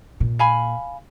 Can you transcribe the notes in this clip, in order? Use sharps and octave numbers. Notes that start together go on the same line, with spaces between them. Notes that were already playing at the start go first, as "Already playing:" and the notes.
A#2
F5 G#5 B5